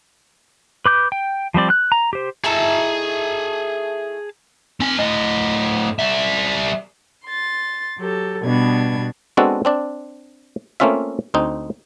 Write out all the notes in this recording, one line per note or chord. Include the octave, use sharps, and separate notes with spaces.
B4 D6 G6
G5
F3 G3 C4 D5
F#6
A#5
G4 C5
A3 D#4 E4 G#4 A5
C4 G#5
A2 D#5
G3 E5
C6 A6
F#3 G4 A4
B2 G3 B3 D4 G#6
G#3 B3 C4 D4 F#4 A4
C4 D4 D5
A3 A#3 C4 C#4 F4 E5
D2 C4 D#4